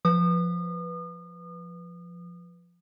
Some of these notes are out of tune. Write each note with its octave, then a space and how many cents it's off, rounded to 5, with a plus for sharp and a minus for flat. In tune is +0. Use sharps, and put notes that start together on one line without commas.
F3 +0 B4 +0 D#6 -35